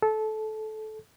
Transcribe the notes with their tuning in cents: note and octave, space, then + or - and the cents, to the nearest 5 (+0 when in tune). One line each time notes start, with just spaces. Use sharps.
A4 -20